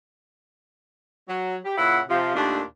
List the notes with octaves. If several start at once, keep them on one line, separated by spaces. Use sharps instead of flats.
F#3
G4
A#2 C#3 E4 F#5
C3 F3
D#2 A#2 A3 D4